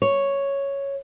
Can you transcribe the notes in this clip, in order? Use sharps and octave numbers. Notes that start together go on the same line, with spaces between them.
C#5